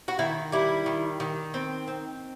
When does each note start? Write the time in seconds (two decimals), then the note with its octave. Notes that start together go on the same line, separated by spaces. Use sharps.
0.08 F#4
0.19 D#3 E4
0.52 G3 E4
0.86 D#3
1.20 D#3
1.54 C4
1.88 C4